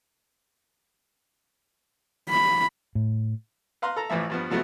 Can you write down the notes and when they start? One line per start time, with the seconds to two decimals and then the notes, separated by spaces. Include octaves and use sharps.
2.29 B5
2.95 A2
3.82 B4 F5 A#5 C6
3.96 A4 A#5
4.10 A1 A2 E3 F3 E5
4.30 G2 F3 B3
4.50 C3 F3 F#3 A3 B3